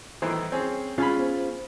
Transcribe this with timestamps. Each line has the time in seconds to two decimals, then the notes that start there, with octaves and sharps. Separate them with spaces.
0.22 A2 D#3 E3 C5
0.52 C4 C#4 G#4
0.98 C#4 F4 G#4 F5 G#5 B5
1.17 B3 C5